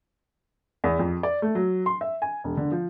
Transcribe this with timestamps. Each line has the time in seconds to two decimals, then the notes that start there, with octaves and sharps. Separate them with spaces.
0.84 E2
0.99 F2
1.23 D5
1.42 A3
1.55 F#3
1.86 C6
2.01 E5
2.22 G#5
2.44 E1
2.57 D3
2.72 F3